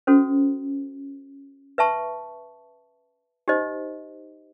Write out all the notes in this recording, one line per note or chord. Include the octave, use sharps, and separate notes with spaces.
C#4 F#4 A4 C5
B4 E5 A5 C#6
D#4 G4 C5 D#5